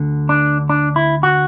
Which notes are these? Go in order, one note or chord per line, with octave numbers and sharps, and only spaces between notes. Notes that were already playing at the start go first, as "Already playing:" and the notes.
Already playing: D2 D3
D4
D4
E4
F#4